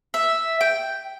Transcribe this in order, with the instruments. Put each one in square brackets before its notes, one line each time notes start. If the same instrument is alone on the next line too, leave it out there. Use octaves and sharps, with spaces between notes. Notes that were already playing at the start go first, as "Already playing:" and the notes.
[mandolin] E5
G5